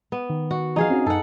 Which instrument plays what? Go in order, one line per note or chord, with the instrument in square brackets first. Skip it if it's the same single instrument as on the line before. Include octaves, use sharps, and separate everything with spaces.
[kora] B3
[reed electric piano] D#3
[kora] F#4
[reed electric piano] E3 F3 [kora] D#4 G#4 F5
[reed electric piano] C4 C#4 F#4
[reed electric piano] F#2 D#4 [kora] A4 F#5